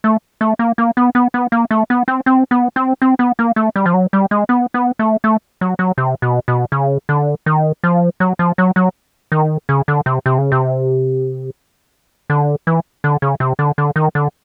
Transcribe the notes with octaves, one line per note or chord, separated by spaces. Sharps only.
A3
A3
A#3
A#3
B3
B3
B3
A#3
A3
B3
C4
C4
B3
C4
C4
B3
A#3
A3
G3
F3
F#3
G3
G#3
B3
B3
A3
A3
F#3
F#3
C3
B2
B2
C#3
D3
D#3
F3
F#3
F3
F#3
F#3
D#3
C#3
D3
C3
C3
C#3
C3
D3
E3
D3
C#3
C3
D3
D3
D#3
D3